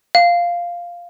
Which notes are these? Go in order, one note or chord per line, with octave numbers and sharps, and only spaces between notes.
F5